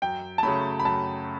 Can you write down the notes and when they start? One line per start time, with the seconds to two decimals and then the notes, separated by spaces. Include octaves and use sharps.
0.02 F#2 G5
0.38 A5
0.43 C#3 F#3 A3 B5
0.80 B5
0.85 F#2 A5